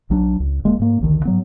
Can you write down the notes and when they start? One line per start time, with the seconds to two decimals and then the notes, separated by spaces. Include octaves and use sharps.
0.10 B1 F#3 C4 D4
0.40 C#2
0.64 D1 G#3 A#3
0.79 G#2 A#3
1.00 A#1 D#2 D3 D#3
1.25 G#2 F#3 B3